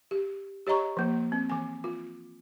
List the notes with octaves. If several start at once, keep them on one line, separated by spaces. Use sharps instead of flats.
G4
G4 C#5 D#5 A#5 C#6
F3 A#3
C4
E3 G#5
F4